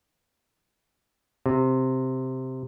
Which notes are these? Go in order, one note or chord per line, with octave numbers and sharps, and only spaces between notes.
C3